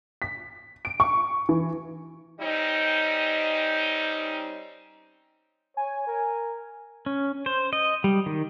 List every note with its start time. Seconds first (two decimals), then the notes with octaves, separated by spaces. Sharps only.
0.22 B6
0.85 D7
1.00 C#6
1.49 E3
2.41 G3 C4 C#4 D#4
5.77 C#5 G#5
6.07 A#4
7.06 C#4
7.46 C5
7.73 D#5
8.04 G3
8.26 D#3